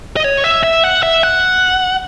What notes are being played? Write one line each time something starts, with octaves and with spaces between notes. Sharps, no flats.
D#5
C#5
E5
E5
F#5
E5
F#5